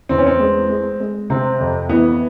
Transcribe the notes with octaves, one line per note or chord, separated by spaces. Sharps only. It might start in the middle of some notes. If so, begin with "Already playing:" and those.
E2 C4
C#4
C4
G#3
G#3
G#3
C3 C4
F2
E3 B3